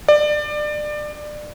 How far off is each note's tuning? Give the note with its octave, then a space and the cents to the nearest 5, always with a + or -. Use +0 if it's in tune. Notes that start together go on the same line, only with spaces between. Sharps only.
D5 +25